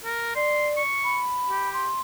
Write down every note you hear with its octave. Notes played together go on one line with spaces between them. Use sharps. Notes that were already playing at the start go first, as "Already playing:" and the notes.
A#4
D5 C6
C#6
B5
G4
C6